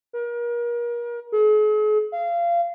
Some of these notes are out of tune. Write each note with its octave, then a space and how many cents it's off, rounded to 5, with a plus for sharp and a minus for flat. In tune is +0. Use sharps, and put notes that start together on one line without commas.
A#4 +35
G#4 +45
F5 -25